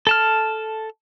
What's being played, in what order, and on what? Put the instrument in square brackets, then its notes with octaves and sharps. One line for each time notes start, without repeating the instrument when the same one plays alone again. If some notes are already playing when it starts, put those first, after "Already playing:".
[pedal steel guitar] A4 A5 F6